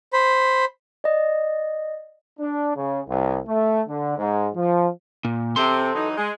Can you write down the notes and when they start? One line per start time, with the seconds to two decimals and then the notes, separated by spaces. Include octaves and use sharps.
0.13 C5 B5
1.04 D5 D#5
2.40 D4
2.75 C#3
3.08 C2
3.47 A3
3.88 D3
4.18 G#2
4.55 F3
5.25 A#2
5.56 C3 C4 A4 C6
5.94 E3 F#3 D#4
6.16 G#3